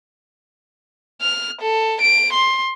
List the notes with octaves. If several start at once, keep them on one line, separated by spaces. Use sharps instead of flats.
F6
A4
D7
C6